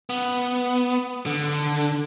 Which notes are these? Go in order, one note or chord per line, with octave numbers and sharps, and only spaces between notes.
B3
D3